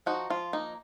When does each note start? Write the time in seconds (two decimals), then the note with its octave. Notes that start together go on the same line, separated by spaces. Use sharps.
0.06 F3 D#4 F#4
0.30 F3 F4
0.53 A#3 D#4